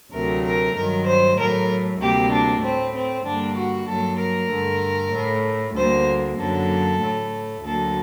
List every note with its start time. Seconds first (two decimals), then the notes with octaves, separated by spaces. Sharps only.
0.13 D2 C3 F#3 A3 A#4
0.44 A#4
0.76 G2 D#3 F#3 A#4
1.07 C5
1.38 A2 F#3 A3 A#4
2.01 D2 C3 G3 A#3 G4
2.33 D4
2.63 A2 A3 C4
2.95 C4
3.26 G2 D3 G3 A#3 D4
3.58 F#4
3.89 G2 F#3 A#3 A4
4.20 A#4
4.51 G2 D3 A3
5.14 A2 A3
5.76 D2 D3 G3 A#3 C5
6.39 F#2 D3 F#3 A#3 A4
7.02 A2 A3
7.64 D2 D3 F#3 A#3 A4